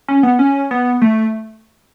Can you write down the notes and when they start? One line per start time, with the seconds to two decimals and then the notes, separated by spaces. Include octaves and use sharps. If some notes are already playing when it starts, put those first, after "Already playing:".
0.08 C#4
0.23 B3
0.39 C#4
0.71 B3
1.02 A3